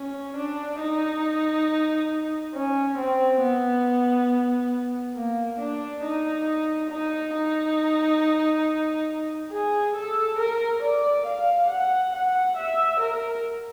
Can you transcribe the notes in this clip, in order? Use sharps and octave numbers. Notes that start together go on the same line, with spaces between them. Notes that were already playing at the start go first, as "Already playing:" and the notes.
Already playing: C#4
D4
D#4
C#4
C4
B3
A#3
D4
D#4
D#4
D#4
G#4
A4
A#4
D5
F5
F#5
F#5
E5
A#4